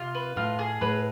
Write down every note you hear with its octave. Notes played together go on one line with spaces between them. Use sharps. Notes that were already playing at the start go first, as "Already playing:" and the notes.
Already playing: C3 F4
B4
A2 F4
G#4
A2 B4